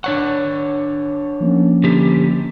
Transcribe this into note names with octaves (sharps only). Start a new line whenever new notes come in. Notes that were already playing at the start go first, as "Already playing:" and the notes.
D4 C#5 F#5 C#6
F3 A#3 C#4
D3 G4